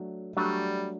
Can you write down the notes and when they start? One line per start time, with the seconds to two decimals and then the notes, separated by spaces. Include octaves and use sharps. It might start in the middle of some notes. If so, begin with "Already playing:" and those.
Already playing: F#3 A3 D4
0.36 F#3 G3 A3 D4